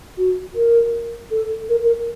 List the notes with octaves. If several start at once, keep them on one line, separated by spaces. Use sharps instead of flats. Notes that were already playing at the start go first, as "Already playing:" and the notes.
F#4
A#4
A4
A#4
A#4